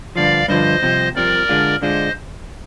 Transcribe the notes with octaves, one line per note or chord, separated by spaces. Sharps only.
G2 D3 F3 D5 F5
G2 D3 F3 C5 D#5
C2 C3 F3
C2 C3 F3 A#4 D5
D3 G#3 D4 F4
D3 G#3 D4 F4 C5 D#5